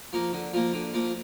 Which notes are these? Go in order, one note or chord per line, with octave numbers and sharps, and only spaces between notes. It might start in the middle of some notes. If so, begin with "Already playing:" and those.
F3 A#3
D3
F3 A#3
D3
F3 A#3